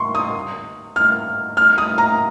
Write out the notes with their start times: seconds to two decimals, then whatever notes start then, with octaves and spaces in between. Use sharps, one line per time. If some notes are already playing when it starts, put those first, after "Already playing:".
Already playing: C6 C#6
0.15 D#6
0.96 F6
1.57 F6
1.78 D#6
1.98 A#5